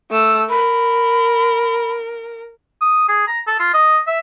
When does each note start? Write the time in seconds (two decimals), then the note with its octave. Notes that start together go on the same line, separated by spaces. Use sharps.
0.11 A3 E6
0.50 A#4 B5
2.81 D#6
3.08 G#4
3.28 A#5
3.47 A4
3.60 F4
3.74 D#5
4.07 E5